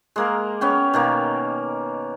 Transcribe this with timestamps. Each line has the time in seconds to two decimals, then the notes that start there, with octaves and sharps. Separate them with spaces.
0.16 G#3 A#3 A#4
0.61 B3 C#4 G5
0.94 B2 D#3 A#3